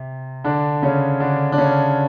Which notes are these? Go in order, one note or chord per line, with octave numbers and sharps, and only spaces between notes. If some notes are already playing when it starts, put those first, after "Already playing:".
Already playing: C3
D3 D4
C#3 C#4
D3 D4
D4
C#3 C#4